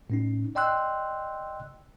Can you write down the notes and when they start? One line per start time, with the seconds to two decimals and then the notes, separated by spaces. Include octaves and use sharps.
0.10 A2 C#4 D#4
0.55 D5 D#5 G5 C6 E6 F#6